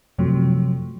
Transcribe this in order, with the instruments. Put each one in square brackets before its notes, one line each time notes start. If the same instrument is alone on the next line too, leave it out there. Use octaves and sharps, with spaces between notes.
[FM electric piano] F#2 C3 F3 F#3 A3